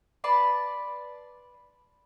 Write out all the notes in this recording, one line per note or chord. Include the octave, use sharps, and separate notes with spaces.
B4 D5 A5 C6